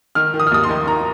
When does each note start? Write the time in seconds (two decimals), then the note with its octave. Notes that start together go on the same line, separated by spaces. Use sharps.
0.15 D#3 F6
0.34 D#3
0.40 D#6
0.47 F6
0.51 D#2 D#6
0.63 C6
0.69 D#3
0.87 D#3 A#5